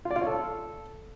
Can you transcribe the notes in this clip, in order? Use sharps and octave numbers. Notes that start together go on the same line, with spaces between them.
F4
D5
F4
C#5
A4